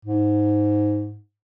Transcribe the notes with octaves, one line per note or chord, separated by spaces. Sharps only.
G#2